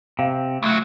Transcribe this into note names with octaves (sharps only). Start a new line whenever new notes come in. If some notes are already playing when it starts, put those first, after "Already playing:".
C3 F5
C#2 F#3 A3